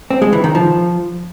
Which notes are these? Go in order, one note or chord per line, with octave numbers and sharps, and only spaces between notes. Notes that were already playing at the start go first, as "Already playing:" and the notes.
C4
G#3
E3
D#3
F3